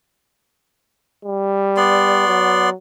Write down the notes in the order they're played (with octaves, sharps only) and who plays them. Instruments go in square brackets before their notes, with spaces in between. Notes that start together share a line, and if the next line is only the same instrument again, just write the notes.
[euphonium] G3
[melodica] B3 D5 C6
[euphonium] F#3